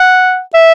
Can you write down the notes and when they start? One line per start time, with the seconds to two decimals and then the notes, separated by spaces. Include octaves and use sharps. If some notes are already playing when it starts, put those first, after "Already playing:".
Already playing: F#5
0.54 E5